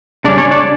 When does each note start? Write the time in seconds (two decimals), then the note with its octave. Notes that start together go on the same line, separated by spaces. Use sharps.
0.24 C#3 G3 C#4 D4 D5
0.38 C#4 C#5
0.51 D4 D5